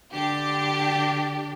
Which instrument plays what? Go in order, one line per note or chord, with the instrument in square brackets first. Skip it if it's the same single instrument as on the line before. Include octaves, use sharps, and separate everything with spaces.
[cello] D3 D4 [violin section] G4